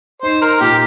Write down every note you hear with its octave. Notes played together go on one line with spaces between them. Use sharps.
D#4 C5
A#4
A#2 G4